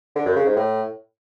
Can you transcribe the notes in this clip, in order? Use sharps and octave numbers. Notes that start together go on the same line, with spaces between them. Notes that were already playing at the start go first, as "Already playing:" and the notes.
D3
F#2
C#3
G#2
A2